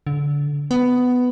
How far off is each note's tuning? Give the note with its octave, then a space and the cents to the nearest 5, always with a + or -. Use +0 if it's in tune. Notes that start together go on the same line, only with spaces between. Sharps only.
D3 -25
B3 +10